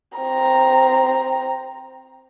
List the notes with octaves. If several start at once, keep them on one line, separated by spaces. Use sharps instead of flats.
C4 A#5